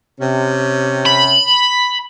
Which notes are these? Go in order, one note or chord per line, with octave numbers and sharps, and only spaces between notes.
C3 C#4
B5